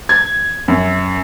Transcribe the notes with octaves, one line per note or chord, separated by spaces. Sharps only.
G#6
F#2